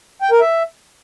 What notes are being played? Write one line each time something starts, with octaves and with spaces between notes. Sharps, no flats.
G5
A#4
E5